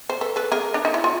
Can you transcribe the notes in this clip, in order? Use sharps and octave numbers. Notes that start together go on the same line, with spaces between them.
C5
A4 B4
A4 B4
G#4 A#4
D4
D#4
E4
F4